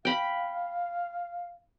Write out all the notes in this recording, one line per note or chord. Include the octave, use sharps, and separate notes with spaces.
F5 G5 B5